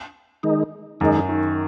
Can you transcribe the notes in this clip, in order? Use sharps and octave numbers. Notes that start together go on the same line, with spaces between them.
D#3 G#3 D#4
F#2 D#3 G#3 D#4
D#3